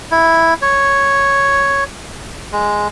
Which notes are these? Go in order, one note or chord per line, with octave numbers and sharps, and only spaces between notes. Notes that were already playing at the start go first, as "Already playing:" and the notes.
E4
C#5
G#3